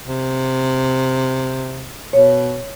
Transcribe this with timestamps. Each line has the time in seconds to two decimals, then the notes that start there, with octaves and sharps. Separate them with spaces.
0.05 C3
2.13 B2 C#5